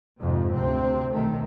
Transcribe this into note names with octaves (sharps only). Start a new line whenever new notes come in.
F2 G#2 C3
D2 C3 C4
B1 D#3 A3